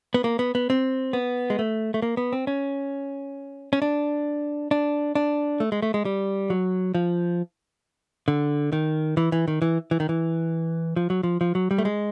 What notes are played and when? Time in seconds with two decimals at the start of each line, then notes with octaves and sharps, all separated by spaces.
0.14 B3
0.24 A#3
0.39 B3
0.55 B3
0.70 C4
1.13 B3
1.50 G#3
1.59 A3
1.94 A3
2.02 A#3
2.17 B3
2.33 C4
2.47 C#4
3.73 C#4
3.82 D4
4.71 D4
5.15 D4
5.60 A3
5.72 G#3
5.82 A3
5.94 G#3
6.05 G3
6.50 F#3
6.94 F3
8.28 D3
8.73 D#3
9.17 E3
9.32 E3
9.48 D#3
9.62 E3
9.91 E3
10.00 D#3
10.09 E3
10.96 F3
11.10 F#3
11.23 F3
11.41 F3
11.55 F#3
11.71 G3
11.78 A3
11.85 G#3